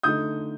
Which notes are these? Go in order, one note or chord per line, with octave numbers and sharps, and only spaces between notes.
D3 A3 D#4 D#6 G6